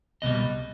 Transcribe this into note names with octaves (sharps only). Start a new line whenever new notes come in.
C2 B2 G3 D#5